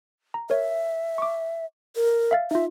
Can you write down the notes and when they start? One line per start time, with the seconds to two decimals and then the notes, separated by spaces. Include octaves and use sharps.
0.34 A#5
0.50 A#4 C#5 E5
1.18 C#6 D6
1.96 A#4
2.31 E5 F5 A6
2.51 D#4 F4 E5